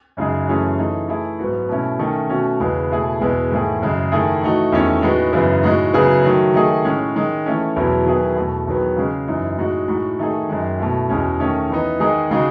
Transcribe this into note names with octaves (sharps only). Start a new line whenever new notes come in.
F#2 C#3 G#3 D#4 G#4
F#2 E3 A3 C#4 G#4
E3 A3 D#4 G#4
E3 A3 E4 G#4
G#2 F#3 B3 F#4
B2 A3 C#4 E4
D#3 A3 C#4
B2 A3 C#4 F#4
E2 C#3 G#3 B3
B2 A3 E4 G#4
E2 B2 G#3 B3
G#2 D#3 A3 E4 G#4
F#2 C#3 G#3
D#3 A3 E4 G#4
E3 A3 D#4 F#4
E2 D#3 A3 C#4
A2 G#3 B3 D#4 F#4
F#2 C#3 E3 B3
A2 G#3 D#4 F#4
C#3 F#3 B3 E4 G#4
D#3 F#3 A3
D#3 A3 D#4 G#4
A2 G#3 C#4
D#3 G#3 D#4
E3 A3 C#4
E2 B2 F#3 B3 E4
D#3 F#3 B3 E4 G#4
E2 B2 A3
E2 D#3 F#3 B3
C#3 G#3 C#4
F#2 E3 G#3 D#4
A2 G#3 D#4 F#4
A2 G#3 D#4 F#4
D#3 A3 D#4 G#4
F#2 D#3 G#3
B2 A3 E4
E2 B2 G#3 C#4
D#3 A3 C#4
E3 B3 D#4
D#3 G#3 D#4 G#4
C#3 G#3 D#4 F#4